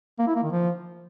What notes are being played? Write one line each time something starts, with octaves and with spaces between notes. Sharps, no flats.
A#3
E4
A#3
D#3
F3